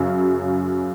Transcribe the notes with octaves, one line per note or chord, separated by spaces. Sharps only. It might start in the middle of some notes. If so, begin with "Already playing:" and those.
Already playing: F#2 C#3 F#3